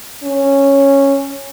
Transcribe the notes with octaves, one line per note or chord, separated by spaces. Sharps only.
C#4